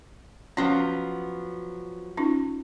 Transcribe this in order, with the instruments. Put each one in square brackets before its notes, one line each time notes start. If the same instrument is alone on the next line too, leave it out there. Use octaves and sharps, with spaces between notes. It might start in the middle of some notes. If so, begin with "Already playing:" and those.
[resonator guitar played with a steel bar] F3 F#3 B3 [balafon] C#4
[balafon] C#4 D#4 F4